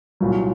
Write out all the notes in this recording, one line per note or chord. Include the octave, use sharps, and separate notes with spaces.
C2 A#2 F#3